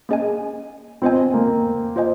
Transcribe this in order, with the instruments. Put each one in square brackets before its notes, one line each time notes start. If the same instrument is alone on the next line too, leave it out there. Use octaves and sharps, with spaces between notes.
[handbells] A#3 C#4 G#4 D#5 G#5
[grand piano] C4 [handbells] F4 C5 D#5 G#5
[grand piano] A#3
[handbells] F4 C5 D#5 G#5